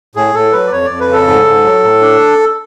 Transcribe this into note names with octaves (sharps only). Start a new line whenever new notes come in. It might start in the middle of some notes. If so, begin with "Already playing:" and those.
A2 G#4
A2 A4
F#3 B4
D5
F2 C#5
F2 D5
B4
C#3 A4
G#2
G#2
F#3
A2
D4